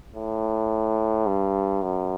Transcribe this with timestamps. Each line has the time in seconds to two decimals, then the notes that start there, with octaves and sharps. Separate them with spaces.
0.15 A2
1.27 G2
1.83 F#2